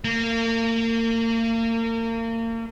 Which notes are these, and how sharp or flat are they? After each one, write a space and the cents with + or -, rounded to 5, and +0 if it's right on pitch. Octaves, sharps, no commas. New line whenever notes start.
A#3 -35